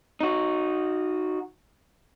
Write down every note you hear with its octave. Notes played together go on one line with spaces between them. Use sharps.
D#4 F#4